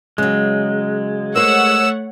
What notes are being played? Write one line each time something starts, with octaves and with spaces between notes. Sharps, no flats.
C#3 F#3 G#3
A3 A#4 C5 C#5 F#5 E6